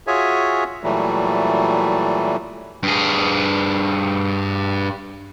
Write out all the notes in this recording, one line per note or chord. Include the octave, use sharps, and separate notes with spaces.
F4 F#4 G#4 C#5 E5 G#5
A#2 E3 F#3 G3 A3
G2 G#4